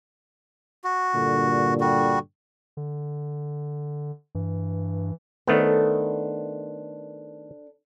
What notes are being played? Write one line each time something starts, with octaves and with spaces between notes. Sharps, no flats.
F#4
G2 A#2 D3
G3 F#4
D3
G2 E3
D#3 A3 B3 D4 A4 C5